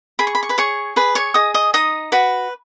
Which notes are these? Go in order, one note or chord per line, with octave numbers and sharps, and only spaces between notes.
G#4 B5
C#6
B5
C#6
B4 B5
G#4 C#5 C#6
G#4 B4 B5
C#5 C#6
G#4 D#5 D#6
D#5 D#6
D#4 D#5 D#6
F#4 B4 B5